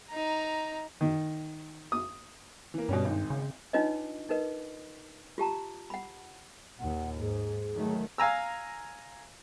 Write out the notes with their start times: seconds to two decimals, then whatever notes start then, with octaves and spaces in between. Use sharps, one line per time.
0.10 D#4 A#5
1.01 D#3
1.92 D#6
2.74 E3 A#3
2.89 G2 B2 G3 C#4
3.05 G#1 G#2
3.30 C#3
3.73 D4 D#4 F4 B4 C#5 D#5
4.29 D#4 A#4 B4 D#5
5.38 F4 G4 A5 A#5
5.90 F#5 B5
6.79 D#2 A#2 F#5
7.19 G#2 G#4
7.75 D#3 F#3 A3
8.18 F5 G#5 A#5 E6